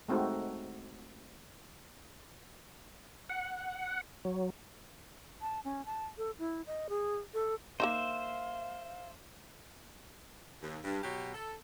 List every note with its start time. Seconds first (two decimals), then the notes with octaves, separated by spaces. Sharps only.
0.08 G#3 A3 C4 D#4 F#4 A4
3.29 F#5
4.25 F#3
5.41 A5
5.65 C#4
5.86 A5
6.18 A4
6.39 E4
6.67 D#5
6.89 G#4
7.34 A4
7.80 A#3 D4 D#4 C5 E5 F5
10.62 D#2
10.84 G2
11.03 B2 F#3 G4
11.34 A4